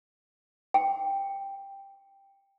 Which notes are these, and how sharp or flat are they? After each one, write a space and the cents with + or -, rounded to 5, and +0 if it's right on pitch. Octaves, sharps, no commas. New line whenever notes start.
G5 +10